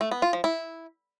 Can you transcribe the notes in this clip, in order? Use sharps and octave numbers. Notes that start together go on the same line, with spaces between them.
A3
B3
F4
F3
E4